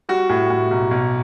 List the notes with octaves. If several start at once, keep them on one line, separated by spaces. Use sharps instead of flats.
G3 F#4
A2
A2
B1
B1